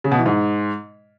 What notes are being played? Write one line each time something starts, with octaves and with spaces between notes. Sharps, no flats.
C#3
B2
E3
G#2